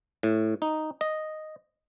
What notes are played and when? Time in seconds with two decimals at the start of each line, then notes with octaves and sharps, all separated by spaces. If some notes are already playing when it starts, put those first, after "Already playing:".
0.23 A2
0.62 D#4
1.01 D#5